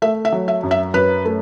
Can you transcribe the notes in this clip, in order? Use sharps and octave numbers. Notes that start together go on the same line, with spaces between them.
A3 E5
E5
F#3
E5
F#2
E5
F#2 B4
A3